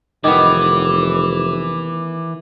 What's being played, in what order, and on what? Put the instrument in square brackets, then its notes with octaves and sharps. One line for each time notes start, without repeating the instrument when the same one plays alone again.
[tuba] F1 [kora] D#3 B3 [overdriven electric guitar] E3 [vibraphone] D6